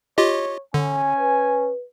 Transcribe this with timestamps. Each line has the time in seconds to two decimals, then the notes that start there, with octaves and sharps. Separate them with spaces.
0.18 F4 G4 C#5 D#5
0.74 D3 C#4 G#5
1.18 B4